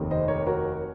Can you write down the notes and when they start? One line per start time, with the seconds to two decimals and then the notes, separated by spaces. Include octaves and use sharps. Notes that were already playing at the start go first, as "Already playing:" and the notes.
Already playing: F1 D#2 D#3
0.11 C5 D#5
0.28 A#4 C#5
0.46 F#4 A#4